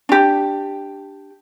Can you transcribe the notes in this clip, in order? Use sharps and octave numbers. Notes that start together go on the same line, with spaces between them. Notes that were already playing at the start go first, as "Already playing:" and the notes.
D4 G4